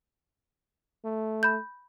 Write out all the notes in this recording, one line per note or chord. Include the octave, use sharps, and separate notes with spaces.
A3
B5 G6